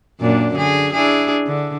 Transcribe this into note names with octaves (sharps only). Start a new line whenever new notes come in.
F#2 A#2 D4
D3 G#4
D4 E4 G#4
D3